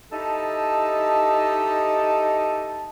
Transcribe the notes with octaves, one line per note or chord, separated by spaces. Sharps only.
D#4 E4 G4 A4 D#5 A5